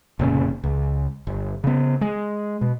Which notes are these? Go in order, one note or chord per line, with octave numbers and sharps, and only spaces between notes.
F1 A#2 C#3
C#2
G1
C#3 B3
G#3
B2